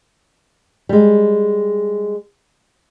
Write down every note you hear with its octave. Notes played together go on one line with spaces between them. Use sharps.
G3 G#3